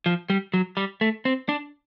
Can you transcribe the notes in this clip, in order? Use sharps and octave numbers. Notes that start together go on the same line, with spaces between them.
F3
G3
F#3
G3
A3
C4
D4